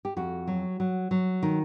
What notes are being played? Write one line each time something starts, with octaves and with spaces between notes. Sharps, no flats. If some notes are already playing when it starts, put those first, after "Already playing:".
G4
F2 F#4
F#3
F#3
F#3
D#3